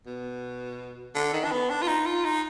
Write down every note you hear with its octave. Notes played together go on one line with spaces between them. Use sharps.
B2
D3
D#3
D4
B3
D4
F4
D#4
F4
D#4